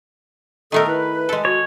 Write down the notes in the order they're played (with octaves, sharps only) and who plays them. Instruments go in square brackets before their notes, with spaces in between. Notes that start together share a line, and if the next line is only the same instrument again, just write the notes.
[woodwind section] A#2 B3 D#5 [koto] D#3 A3 A#4 [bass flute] A4
[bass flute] E4 [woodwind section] B4
[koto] G#3 A4
[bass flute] F#4 [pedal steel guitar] C#5